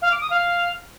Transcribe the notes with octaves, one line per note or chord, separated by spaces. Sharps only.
F5
D6
D#6
F5